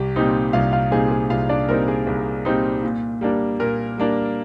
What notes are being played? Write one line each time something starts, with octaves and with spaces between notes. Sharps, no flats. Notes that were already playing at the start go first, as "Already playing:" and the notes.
Already playing: C2 G4
A#2 G3 C4 D#4
C2 F4 F5
F4 F5
A#2 G3 C4 D#4 G#4
G#4
C2 F4 F5
D4 D5
A#2 G3 C4 D#4 A#4
G#4
C2 G#4
A#2 G3 C4 D#4
A#2
G3 A#3 D4
A#2 A#4
G3 A#3 D4